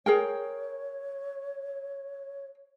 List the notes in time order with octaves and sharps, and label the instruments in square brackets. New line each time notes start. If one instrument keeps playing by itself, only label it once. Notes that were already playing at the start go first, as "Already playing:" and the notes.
[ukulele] G#4 A#4 G5 [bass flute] C#5